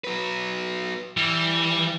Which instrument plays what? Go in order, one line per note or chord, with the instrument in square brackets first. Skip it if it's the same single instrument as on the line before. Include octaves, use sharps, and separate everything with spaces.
[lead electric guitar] F#3 B4
[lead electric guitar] E3 [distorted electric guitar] G3